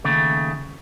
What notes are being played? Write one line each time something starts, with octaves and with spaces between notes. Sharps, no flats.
D#2 C#3 A3